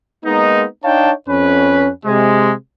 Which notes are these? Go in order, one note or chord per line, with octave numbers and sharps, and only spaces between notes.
G#3 A#3 B3 D#4
D4 D#4 C#5 F5 G5 A5
F2 C#4 B4
C3 G#3